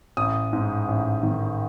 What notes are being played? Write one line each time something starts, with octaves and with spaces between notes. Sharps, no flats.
A1 D#6
G#2
A1
D#3